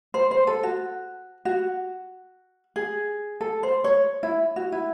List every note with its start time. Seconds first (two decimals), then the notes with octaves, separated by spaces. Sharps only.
0.14 C5
0.31 C5
0.47 A4
0.63 F#4
1.45 F#4
2.76 G#4
3.41 A4
3.63 C5
3.84 C#5
4.23 E4
4.56 F#4
4.72 E4